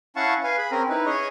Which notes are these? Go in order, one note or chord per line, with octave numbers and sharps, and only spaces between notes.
C#4 E4 F5 F#5 A5 C#6
B4 F5 G#5
G#4 B5
C4 C#4 A#4 A#5
D#4 E4 B4
C#4 G#4 C#5 D#5